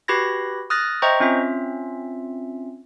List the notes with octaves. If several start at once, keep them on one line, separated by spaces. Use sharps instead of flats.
F#4 G4 B4 B5 G#6 A#6
D#6 F6 F#6 A6 A#6
C5 D#5 E5 G5 A#5 C#6
C4 C#4 F4 E5